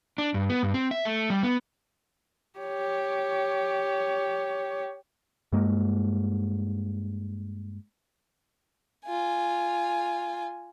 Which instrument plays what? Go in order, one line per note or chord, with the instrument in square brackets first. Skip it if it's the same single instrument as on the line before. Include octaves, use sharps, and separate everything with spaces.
[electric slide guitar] D4
G2
B3
G2
C4
E5
A3
G3
B3
[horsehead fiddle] G4 C#5
[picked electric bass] G2 G#3 A#3
[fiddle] F4 G#5